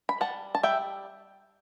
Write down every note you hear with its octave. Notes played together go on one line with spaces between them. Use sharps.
B5
G3 F#5 A5
A5
G3 E5 G5